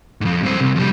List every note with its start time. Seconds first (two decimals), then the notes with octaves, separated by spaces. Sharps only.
0.21 F2 G#2
0.43 G2 C4
0.60 C2
0.76 F2 G3